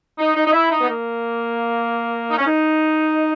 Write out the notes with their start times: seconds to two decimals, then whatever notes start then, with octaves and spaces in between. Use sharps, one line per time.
0.18 D#4
0.35 D#4
0.47 D#4
0.53 E4
0.71 D#4
0.81 B3
0.89 A#3
2.31 D#4
2.38 C#4
2.45 D#4